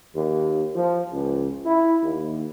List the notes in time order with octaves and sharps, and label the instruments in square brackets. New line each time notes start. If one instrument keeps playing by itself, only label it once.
[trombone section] D#2
F3
C#2
E4
D#2